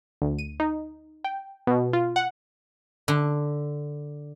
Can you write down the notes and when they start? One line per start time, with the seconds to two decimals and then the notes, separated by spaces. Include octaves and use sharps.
0.22 D2
0.39 D#7
0.60 D#4
1.24 G5
1.67 B2
1.93 F4
2.16 F#5
3.08 D3 A5